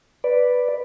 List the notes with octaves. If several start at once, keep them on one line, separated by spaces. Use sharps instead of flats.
B4 D5